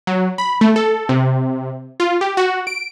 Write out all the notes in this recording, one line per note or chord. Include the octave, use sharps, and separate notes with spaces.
F#3
B5
A3
A4
C3
F4
G4
F#4
D7